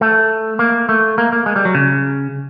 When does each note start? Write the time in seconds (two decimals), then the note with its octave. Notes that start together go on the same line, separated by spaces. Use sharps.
0.01 A3
0.59 A#3
0.89 A3
1.18 A#3
1.32 A#3
1.46 G#3
1.56 G3
1.65 F#3
1.75 C#3